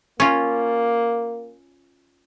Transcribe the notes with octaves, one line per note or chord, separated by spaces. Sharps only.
A#3 C#4 F4